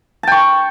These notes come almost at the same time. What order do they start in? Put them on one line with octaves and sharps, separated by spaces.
A5 G5 C#6